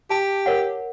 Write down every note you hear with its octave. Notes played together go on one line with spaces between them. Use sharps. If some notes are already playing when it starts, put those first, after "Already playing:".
G4 A5
A#4 C#5 F#5